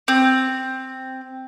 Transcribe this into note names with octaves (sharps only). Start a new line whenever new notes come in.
C4